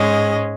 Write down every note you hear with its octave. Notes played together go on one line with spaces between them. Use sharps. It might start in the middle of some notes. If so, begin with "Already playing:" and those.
Already playing: G#2 G#3 C#4 D#5